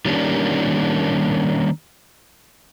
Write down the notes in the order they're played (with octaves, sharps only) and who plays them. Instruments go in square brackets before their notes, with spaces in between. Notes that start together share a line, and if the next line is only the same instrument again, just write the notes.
[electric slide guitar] D#3 G3 A#3 C#4 D4